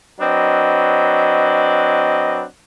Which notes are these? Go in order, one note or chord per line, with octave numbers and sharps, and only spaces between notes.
F#3 C4 D4 B4 D#5